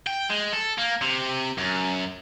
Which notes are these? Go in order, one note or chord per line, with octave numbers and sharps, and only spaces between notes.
G5
G#3
A4
A#3
C3
F#2